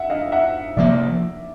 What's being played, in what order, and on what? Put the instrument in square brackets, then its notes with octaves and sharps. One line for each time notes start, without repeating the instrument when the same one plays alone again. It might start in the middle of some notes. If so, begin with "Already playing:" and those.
Already playing: [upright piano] E5 F#5
D#5 F5
E5 F#5
[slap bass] C3 F3 A#3 [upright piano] D5 E5